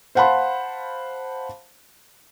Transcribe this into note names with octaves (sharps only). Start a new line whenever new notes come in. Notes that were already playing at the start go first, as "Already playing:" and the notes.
C5 F5 F#5 A5 B5 C6